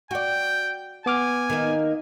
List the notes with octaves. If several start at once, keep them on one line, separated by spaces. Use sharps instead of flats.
F#4 D5 G5
B3 G#5 D6 F6
D#3 A#3 D#4